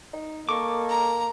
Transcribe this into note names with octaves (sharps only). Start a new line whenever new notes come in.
D#4
A#3 A4 D#5 C#6 D6
A#5